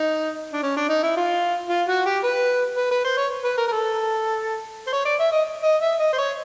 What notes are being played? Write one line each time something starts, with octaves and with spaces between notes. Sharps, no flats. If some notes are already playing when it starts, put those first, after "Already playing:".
Already playing: D#4
D4
C#4
D4
D#4
E4
F4
F4
F#4
G4
B4
B4
B4
C5
C#5
B4
A#4
A#4
A4
C5
C#5
D5
E5
D#5
D#5
E5
D#5
C5
C#5